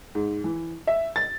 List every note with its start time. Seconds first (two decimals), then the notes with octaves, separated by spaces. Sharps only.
0.15 G#2
0.44 E3
0.87 E5
1.16 A6